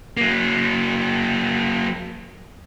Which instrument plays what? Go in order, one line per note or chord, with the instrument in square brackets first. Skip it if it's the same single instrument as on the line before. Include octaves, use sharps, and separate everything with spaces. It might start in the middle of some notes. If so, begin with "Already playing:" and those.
[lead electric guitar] F#3 A#3